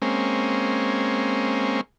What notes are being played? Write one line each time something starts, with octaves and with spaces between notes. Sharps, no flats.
G#3 A#3 C4 C#4